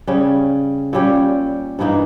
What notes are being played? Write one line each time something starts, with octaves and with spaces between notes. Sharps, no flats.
C#3 G3 C#4
A#2 G3 C#4 G4
G2 E3 A#3 D#4